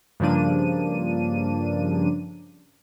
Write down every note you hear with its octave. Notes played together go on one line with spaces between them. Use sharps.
G2 C#3 F3 A#3 D4 D#7